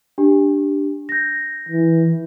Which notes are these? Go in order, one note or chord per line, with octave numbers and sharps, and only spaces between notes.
D4 G4
G6 A#6
E3